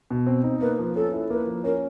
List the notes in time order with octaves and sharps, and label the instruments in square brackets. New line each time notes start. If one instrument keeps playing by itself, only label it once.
[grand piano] B2
C4
D#4
[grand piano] A#3 [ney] B4
[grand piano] F3
[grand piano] C#4 [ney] A4
[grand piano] E4
[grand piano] A#3 [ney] B4
[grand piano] F3
[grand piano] C#4 [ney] A#4